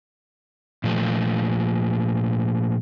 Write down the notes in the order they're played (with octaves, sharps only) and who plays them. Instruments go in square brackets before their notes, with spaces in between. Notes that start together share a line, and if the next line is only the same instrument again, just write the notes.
[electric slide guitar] A#2 F3 A3